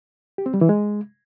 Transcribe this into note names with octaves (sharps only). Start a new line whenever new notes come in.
G4
C4
G3
E3
G#3